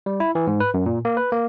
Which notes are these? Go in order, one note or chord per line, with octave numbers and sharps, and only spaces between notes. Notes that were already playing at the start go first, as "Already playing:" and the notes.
G3
E4
E3
G#2
B4
F#2
A#2
A#3
B4
A#3